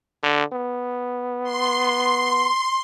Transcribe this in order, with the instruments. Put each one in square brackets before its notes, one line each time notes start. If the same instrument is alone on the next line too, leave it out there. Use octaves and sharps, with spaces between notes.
[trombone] D3
B3
[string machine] C6